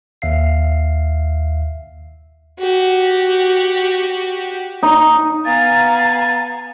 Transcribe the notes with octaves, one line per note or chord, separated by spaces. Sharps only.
D#2 E5 F5 C7
F#4 G4
D#4
B3 F5 G#5 A#5 A6